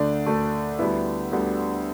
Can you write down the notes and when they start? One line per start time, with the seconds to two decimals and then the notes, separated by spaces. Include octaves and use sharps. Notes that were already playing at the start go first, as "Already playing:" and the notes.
Already playing: D2 D3 A3 D4 D5
0.26 D2 D3 A3
0.79 D2 D3 G3 B3 E4 E5
1.32 D2 D3 G3 B3